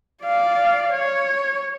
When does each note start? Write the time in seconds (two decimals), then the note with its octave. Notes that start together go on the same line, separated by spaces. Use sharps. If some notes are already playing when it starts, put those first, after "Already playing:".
0.23 D5 F5
0.92 C#5